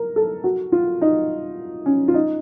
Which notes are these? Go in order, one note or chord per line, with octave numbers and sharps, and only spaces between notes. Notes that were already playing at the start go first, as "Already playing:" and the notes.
Already playing: A#4
A4
F#4
F4
D#4
C#4
F4
D#4